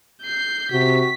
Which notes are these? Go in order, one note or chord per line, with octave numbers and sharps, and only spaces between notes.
G6 C7
C3 F#4 B6